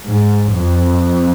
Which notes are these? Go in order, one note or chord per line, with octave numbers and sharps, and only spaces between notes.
G#2
F2